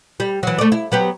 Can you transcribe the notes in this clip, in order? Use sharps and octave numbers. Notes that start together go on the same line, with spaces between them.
G3
E3 F#3
A3 D5
E4
F#3 B3 G4